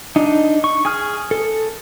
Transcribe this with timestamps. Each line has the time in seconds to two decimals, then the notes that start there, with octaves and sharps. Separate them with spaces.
0.16 D4 D#4
0.64 C#6
0.85 G#4 G#5 D#6 F6
1.31 A4